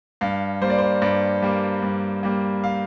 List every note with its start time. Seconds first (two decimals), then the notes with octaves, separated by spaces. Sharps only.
0.21 G2 F5
0.61 G3 A#3 C5
0.70 D5
0.78 C5
1.02 G2 D5
1.42 G3 A#3
1.82 G2
2.23 G3 A#3
2.64 F5